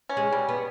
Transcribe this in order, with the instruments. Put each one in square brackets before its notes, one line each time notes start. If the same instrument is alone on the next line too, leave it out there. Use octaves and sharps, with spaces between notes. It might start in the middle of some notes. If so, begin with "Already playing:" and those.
[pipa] C#4
[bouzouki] G#3
[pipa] G3
[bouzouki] B3